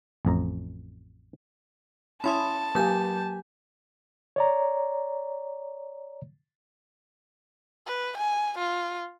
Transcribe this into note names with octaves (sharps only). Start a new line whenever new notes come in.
A1 F2 A#5
C#4 E4 A5 B5 C6 D#6
F#3 A#3 G4 G#5 G6
C#5 D5 A#5
B4
G#5
F4